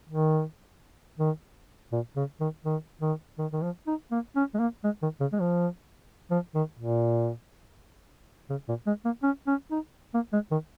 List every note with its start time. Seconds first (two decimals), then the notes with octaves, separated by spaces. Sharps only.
0.10 D#3
1.19 D#3
1.92 A#2
2.16 C#3
2.40 D#3
2.65 D#3
3.01 D#3
3.39 D#3
3.53 D#3
3.62 F3
3.87 D#4
4.11 A#3
4.36 C#4
4.54 G#3
4.59 A#3
4.84 G#3
5.02 D#3
5.20 C#3
5.33 G#3
5.40 F3
6.31 F3
6.55 D#3
6.79 A#2
8.50 C#3
8.68 A#2
8.87 G#3
9.05 A#3
9.23 C#4
9.47 C#4
9.71 D#4
10.14 A#3
10.33 G#3
10.51 D#3